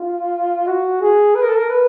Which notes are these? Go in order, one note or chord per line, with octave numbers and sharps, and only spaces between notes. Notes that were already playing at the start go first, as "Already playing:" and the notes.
Already playing: F4
F#4
G#4
B4
A#4
A4
A#4
B4